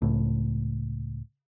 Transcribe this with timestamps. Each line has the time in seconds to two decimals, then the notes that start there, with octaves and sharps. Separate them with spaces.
0.02 C#2 A2